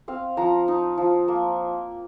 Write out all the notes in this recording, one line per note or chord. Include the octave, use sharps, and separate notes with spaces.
C4 F5
F3 A#5
D#4
F3
A#3